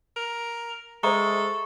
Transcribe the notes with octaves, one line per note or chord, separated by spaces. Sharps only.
A#4
G#3 A4 C5 E5 A#5 C#6